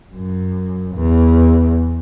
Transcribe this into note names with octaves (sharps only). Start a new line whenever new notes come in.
F#2
E2